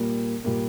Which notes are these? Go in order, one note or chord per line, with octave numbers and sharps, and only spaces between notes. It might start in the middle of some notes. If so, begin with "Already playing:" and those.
Already playing: A#2 G3 A#3
A#2 G3 A#3